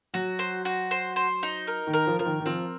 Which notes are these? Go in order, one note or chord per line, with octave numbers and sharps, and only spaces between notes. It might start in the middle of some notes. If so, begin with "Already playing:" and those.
F#3 F#4
C5
F#4
C5
C5
D#4
A#4
D#3
A#4
F3
F3 A#4
D#3
D#3
F3 C4